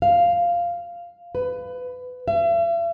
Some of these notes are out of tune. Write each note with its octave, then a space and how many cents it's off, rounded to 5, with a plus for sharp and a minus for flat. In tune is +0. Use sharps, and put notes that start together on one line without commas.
F5 -5
B4 +20
E5 +45